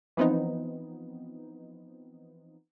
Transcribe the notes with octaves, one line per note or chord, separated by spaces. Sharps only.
E3 F3 B3 C4 D#4